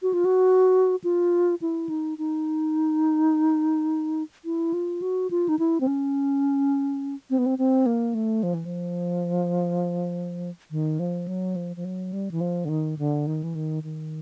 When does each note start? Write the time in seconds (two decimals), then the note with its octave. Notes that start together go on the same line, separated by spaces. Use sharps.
0.02 F#4
0.13 F4
0.25 F#4
1.04 F4
1.62 E4
1.89 D#4
2.18 D#4
4.45 E4
4.73 F4
5.02 F#4
5.31 F4
5.49 D#4
5.59 E4
5.81 C4
5.87 C#4
7.30 C4
7.38 B3
7.46 C4
7.58 C4
7.86 A#3
8.14 A3
8.43 F3
8.54 E3
8.65 F3
10.71 D#3
10.99 F3
11.28 F#3
11.56 F3
11.76 F3
11.85 F#3
12.13 G3
12.31 E3
12.41 F3
12.65 D3
12.69 D#3
12.99 D3
13.27 D#3
13.43 E3
13.55 D#3
13.83 D#3